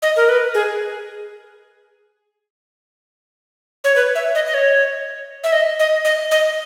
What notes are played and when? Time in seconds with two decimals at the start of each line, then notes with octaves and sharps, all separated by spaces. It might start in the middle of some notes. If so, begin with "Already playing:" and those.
0.02 D#5
0.17 A#4
0.29 B4
0.54 G#4
3.84 C#5
3.96 B4
4.15 E5
4.35 D#5
4.46 D#5
4.54 C#5
5.44 E5
5.52 D#5
5.79 D#5
6.05 D#5
6.31 D#5